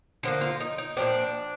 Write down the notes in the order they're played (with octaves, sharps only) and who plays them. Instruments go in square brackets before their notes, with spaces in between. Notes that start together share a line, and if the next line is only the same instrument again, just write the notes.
[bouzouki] D3 F3 A#3
F4
D#4
D#4
A#2 F3 C4 D4